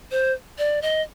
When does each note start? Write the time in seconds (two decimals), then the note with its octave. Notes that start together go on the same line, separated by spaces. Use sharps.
0.11 C5
0.58 D5
0.82 D#5